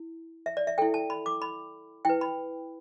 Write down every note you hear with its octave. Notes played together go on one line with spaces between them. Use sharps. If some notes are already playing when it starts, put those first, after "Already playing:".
Already playing: E4
E5
D5
E5
E4 A4 G5
A5
B5
D6
B5
E4 B4 G5
B5